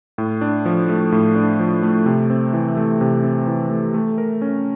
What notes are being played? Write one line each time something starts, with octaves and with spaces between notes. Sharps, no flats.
A2
D4
F3
A3
A2
D4
F3
A3
C3
C4
E3
A3
C3
C4
E3
A3
A3
A#4
C#4